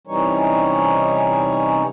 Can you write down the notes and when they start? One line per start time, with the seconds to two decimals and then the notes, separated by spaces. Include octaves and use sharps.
0.07 C3 E3 G3 C#4 D#4 C#5